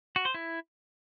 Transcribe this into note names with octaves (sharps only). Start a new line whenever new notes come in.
F#4
C5
E4